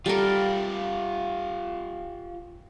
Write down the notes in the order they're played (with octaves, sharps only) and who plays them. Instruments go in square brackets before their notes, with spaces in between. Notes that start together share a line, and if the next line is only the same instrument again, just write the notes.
[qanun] G3 A4 A#4 [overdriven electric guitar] F4 G4